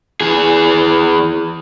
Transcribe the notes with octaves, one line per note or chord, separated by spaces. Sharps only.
E3 G#4